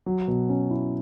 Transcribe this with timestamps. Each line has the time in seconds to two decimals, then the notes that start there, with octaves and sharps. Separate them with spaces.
0.06 F#3
0.28 B2
0.49 C#4
0.71 E4